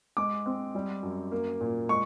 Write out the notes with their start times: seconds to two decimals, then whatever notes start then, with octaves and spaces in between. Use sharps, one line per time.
0.17 G#3 D6
0.46 C4
0.75 G3
1.03 F#2
1.32 A#3
1.60 A#2
1.89 G#3 C#6